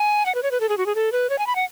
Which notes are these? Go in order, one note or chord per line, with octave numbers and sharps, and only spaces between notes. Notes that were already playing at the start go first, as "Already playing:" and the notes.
Already playing: G#5
F#5
B4
C#5
B4
A4
G#4
F#4
G#4
A4
B4
C#5
G#5
B5
F#5